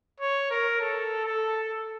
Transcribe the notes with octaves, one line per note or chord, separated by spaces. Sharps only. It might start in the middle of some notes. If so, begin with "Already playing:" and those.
C#5
A#4
A4
A4